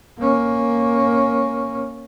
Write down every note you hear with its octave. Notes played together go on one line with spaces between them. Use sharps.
A#3 C#4